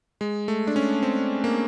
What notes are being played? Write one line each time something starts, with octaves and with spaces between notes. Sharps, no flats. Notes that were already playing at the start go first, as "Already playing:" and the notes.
G#3
A3
D4
C#4
C4
A#3